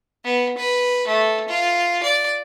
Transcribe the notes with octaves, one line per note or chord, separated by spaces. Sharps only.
B3
B4
A3
F4
D5